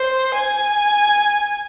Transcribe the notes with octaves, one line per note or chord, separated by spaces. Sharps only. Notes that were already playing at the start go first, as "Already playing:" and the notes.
Already playing: C5
G#5